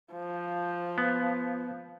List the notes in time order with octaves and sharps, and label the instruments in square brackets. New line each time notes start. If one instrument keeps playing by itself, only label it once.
[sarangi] F3
[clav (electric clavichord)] B3